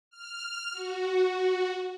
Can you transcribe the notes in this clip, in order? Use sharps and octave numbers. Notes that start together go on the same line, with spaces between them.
F6
F#4